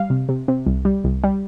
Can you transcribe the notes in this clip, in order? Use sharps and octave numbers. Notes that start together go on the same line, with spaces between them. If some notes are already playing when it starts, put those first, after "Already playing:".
Already playing: G3 F5
C3
C3
C3
C2
G3
C2
G3